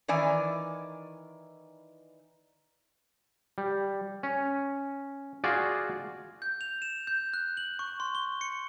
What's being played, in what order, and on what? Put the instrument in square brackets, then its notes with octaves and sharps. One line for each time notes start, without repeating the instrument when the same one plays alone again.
[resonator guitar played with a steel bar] D#3 E3 D5 G#5
[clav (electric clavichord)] G3
C#4
F4 F#4 G#4 D5
[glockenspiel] G6
F7
E7
G6
F#6
F#7
C#6
C6
G7
C#7